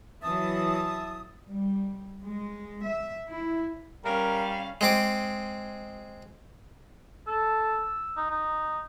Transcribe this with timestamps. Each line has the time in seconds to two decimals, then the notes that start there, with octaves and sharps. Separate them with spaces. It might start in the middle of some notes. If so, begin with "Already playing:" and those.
0.22 E3 F#3 E5 A5 D#6
1.50 G3
2.25 G#3
2.85 E5
3.29 E4
4.05 G3 C#4 A#4 F5
4.81 G#3 C4 D6
7.27 A4 E6
8.17 D#4
8.31 D#4